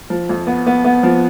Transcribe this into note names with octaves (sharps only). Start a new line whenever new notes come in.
F3
F2
B3
B3
B3
F3